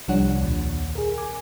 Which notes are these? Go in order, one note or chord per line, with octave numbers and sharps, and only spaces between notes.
C2 F3 G3 D4 C#5 F#5
D#2 A#2
G#4 A#4
G#5 D6